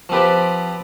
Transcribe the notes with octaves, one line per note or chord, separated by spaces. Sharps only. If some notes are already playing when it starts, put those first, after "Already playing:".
F3 C4 G4 B4 D5